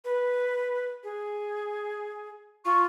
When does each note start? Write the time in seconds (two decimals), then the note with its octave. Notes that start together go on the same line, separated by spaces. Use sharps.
0.05 B4
1.04 G#4
2.65 F4 C#6